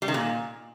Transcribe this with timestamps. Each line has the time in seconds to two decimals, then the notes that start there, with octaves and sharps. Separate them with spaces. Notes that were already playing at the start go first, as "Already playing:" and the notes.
0.02 G3
0.08 D#3
0.14 A#2